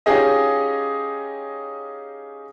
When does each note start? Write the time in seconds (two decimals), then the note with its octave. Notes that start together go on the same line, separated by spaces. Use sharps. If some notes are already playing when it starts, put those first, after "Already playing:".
0.06 C#4 D#4 F4 G4 G#4 D#5